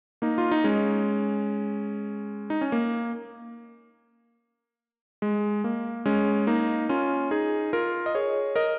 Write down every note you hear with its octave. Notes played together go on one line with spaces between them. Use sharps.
A#3 D#4
F4
D#4
G#3 C#4
D#4
C#4
A#3
G#3
A#3
G#3 C#4
A#3 D#4
C#4 F4
D#4 G#4
F4 A#4
D#5
G#4 C#5
A#4 D#5